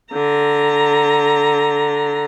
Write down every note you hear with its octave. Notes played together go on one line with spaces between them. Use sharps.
D3 A#5